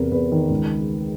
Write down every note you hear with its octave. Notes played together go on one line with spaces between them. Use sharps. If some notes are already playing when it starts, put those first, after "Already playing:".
Already playing: E2 C3 A#4 B4
E2 B4
D#3
C#2